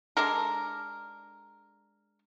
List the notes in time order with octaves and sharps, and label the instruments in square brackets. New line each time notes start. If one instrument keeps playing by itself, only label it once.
[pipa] G#3 D4 A4 A#4